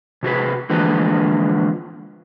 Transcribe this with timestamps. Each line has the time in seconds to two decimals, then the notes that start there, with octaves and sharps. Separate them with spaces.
0.23 C3 F#4 G#4 B4
0.70 D3 E3 F3 G#3 A#3 B4